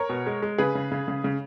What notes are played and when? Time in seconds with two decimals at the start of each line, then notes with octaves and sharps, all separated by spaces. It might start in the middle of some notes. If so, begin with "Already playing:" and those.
Already playing: A#4 C#5
0.09 B2
0.26 G#3
0.42 G#3
0.58 C#3 G#4 B4
0.75 C#3
0.91 C#3
1.08 C#3
1.24 C#3